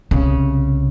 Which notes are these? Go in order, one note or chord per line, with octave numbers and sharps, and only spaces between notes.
C2 C#3